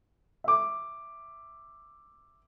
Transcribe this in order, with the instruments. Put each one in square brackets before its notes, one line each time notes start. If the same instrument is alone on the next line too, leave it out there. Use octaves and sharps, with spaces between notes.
[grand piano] E5 D6